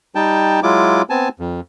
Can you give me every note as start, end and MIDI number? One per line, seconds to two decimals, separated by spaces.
0.15 0.60 55
0.15 0.60 63
0.15 0.60 79
0.15 0.60 81
0.63 1.02 54
0.63 1.02 56
0.63 1.02 64
0.63 1.02 65
0.63 1.02 86
1.10 1.29 59
1.10 1.29 60
1.10 1.29 80
1.10 1.29 81
1.39 1.60 41